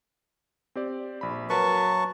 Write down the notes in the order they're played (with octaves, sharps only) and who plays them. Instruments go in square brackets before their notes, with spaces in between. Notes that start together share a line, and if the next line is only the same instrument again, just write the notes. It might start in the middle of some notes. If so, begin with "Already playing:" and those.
[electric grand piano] C4 G4 D5
A#1 B5
[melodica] F#3 A5 C#6 [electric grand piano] A#4 B4